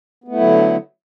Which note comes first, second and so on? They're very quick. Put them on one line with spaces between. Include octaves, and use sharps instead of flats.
B3 A3 E4 F#3 D3